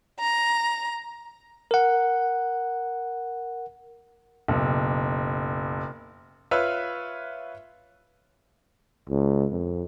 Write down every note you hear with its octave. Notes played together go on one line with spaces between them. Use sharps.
A#5
A#4 F#5
F#1 B1
F4 B4 C#5 E5
C#2
F2